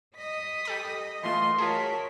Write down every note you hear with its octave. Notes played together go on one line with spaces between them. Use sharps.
D#5 D#6 B6
G4 A4 B5
E3 A3 F4 C6
F4 F#4 G#4 A#4 C#5 A5 B6